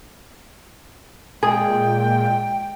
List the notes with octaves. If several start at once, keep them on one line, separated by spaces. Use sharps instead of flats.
A#2 G#3 G#4 G5